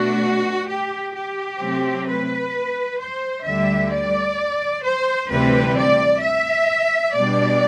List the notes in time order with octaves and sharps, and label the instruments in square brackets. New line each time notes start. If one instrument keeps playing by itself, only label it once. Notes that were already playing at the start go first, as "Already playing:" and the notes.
Already playing: [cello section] B2 A3 D4 F#4
G4
G4
C3 F#3 A3 C4
B4
C5
D2 D3 G3 E5
D5
C5
D2 C3 E3 G3 C4 B4
D5
E5
B2 G3 D4 D5